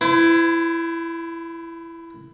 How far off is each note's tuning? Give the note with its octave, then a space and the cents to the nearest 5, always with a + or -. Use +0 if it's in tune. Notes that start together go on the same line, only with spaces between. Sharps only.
E4 +15 C5 -45